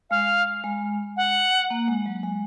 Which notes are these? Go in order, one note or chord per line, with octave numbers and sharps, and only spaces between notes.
G#3 F5
G#3
F#5
A#3
G#3
F#3
G#3